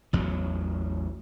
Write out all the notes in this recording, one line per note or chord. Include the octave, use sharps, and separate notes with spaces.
A1 E2 F#3